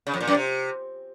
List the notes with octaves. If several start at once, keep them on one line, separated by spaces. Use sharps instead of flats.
C#3
F2
A#2
F#2
C3